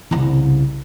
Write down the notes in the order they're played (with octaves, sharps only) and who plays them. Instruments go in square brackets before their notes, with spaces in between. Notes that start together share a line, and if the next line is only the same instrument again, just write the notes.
[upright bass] C2 C#3